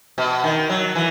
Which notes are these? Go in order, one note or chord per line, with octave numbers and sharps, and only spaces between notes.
B2
D#3
F#3
E3